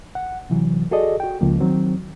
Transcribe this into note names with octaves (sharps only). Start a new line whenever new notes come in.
F#5
C3 E3 F#3
F#4 G#4 A4 D5 D#5
F#4 G5
C#2 F3 A#3
D#3 F#3 C4